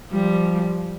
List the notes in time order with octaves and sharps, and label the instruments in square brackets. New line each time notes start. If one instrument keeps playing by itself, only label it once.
[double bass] F3 [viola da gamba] G3